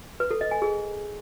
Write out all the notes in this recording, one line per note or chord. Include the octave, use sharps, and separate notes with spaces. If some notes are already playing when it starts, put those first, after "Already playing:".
B4
A4
D#5
G#5
G#4